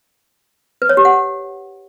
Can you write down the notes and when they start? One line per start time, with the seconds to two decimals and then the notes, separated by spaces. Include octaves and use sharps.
0.82 B4
0.89 C#5
0.97 G4
1.05 F#5